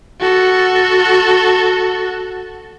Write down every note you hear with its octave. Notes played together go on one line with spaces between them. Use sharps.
F#4 A4